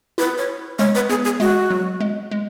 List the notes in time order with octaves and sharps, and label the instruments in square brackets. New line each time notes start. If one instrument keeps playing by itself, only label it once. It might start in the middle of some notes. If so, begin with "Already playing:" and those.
[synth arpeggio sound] E4 [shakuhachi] B4
[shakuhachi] C#5
[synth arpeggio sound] G#3 [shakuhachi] C#5
[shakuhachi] B4
[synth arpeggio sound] B3 [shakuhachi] G#4
[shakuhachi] G#4
[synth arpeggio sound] G#3 [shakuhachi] F#4
[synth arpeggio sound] F#3
G#3
G#3